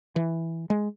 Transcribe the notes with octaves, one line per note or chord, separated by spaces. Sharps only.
E3
G#3